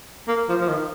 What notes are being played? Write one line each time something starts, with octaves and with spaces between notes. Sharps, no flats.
A#3
F3
F3
D#3